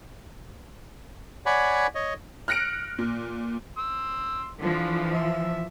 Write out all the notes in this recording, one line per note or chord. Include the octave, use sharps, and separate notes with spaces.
C#5 D5 F#5 G#5 B5
C#5 D#5
F6 F#6 A#6 C#7 D7
A#2
C6 E6
D3 E3 F3
E5